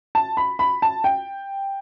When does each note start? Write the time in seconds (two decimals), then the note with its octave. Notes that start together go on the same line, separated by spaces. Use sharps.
0.15 A5
0.37 B5
0.59 B5
0.82 A5
1.04 G5